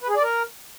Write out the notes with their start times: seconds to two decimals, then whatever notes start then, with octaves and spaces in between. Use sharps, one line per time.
0.01 B4
0.08 G#4
0.16 D5
0.23 A#4